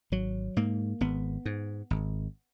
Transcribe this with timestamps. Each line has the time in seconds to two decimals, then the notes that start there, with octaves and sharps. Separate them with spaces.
0.12 G#1 F#3
0.57 G#2 A#3
1.01 G#1 B3
1.46 G#2
1.91 G#1